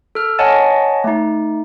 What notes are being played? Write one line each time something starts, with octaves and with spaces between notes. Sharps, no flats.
A4 F6
C#5 D#5 F#5 G#5 A5 A6
A3 D#4